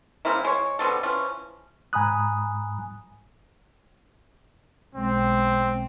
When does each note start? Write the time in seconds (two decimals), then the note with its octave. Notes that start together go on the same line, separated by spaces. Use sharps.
0.25 C#3 A#3 C4 E4
0.45 G#3 C#5
0.79 B2 D3 C4 A4
1.03 E3 F3 C#4
1.93 G#2 G#5 A#5 B5 D#6 F#6
4.95 B1 G#3 C4